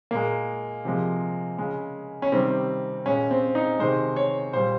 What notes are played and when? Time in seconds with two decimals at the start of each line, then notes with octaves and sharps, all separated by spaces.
0.11 A#2 G#3 A#3
0.85 C3 F3 G#3
1.58 C#3 G#3
2.22 C#4
2.32 C3 D#3 G3 C4
3.06 A#2 G#3 C#4
3.31 C4
3.55 D#4
3.79 C3 D#3 G#3 C5
4.16 C#5
4.53 A#2 G3 C5